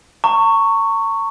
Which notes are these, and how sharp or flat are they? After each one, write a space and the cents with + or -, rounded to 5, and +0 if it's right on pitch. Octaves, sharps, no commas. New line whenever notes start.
A#5 -45 C#6 +0